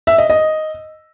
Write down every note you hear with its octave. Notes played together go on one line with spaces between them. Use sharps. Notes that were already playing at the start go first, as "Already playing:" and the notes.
E5
D#5
D#5